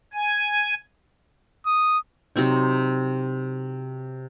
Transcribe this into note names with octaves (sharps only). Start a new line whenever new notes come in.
G#5
D#6
C3 F#3 C4 D#4